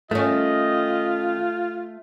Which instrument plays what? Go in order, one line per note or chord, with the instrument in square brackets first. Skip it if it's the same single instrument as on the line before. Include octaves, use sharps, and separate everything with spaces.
[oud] D#3 C#4 [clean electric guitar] A3 [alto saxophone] F4 [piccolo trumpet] D#5